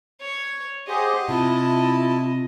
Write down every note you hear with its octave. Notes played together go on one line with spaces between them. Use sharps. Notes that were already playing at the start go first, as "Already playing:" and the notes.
C#5
G4 G#4 C5 D#5 F#5
C3 E4 F4 A5